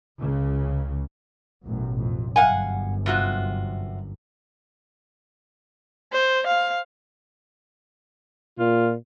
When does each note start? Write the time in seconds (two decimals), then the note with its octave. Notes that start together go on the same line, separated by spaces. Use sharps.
0.19 C#2 C#3
1.65 A1 F#2 B2
2.00 F2
2.36 G1 F#2 F5 F#5 G#5
3.06 C3 F4 F#4
6.13 C5
6.47 F5
8.59 A#2 F4